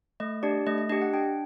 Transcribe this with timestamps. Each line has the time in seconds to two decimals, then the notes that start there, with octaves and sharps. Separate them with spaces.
0.20 A3 D#5
0.43 D4 G4 D5
0.67 A3 D#5
0.78 D#5
0.90 D4 G4 D#5
1.02 F#5
1.13 D4 G5